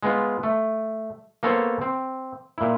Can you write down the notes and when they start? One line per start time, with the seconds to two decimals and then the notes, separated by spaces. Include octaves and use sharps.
0.03 G#3 B3 F4
0.43 A3
1.43 A#3 B3 A4 C5 C#5
1.81 C4
2.58 A#2 E4